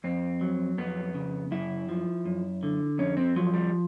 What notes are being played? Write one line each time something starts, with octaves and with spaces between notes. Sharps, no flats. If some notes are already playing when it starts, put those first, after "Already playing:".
F2 C4
F#3
F2 B3
C#3
F#2 E4
F3
F#2
D3
F2 C#4
C4
F3 F#3
G3